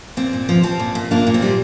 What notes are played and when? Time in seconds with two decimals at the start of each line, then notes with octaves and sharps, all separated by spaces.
0.17 A#2 C4
0.33 A#2
0.49 F3
0.63 F3 C4
0.80 A#2
0.95 A#2
1.11 A#2 A#3 D4
1.27 A#2
1.34 C4 F4
1.42 G3